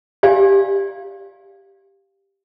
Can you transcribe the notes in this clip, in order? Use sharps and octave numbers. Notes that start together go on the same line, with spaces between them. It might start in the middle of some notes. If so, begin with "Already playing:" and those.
G4 D5 F5 G#5